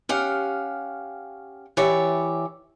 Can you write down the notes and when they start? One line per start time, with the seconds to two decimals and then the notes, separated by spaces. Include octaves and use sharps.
0.09 C#4 G4 F5 F#5
1.77 E3 G4 C#5 D5 E5